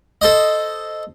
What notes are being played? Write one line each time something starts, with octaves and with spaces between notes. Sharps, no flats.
A4 C5 D#5